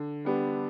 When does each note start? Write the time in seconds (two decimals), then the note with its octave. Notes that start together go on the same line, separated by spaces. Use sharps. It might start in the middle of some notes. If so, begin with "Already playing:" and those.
Already playing: D3
0.25 G3 B3 D4 G4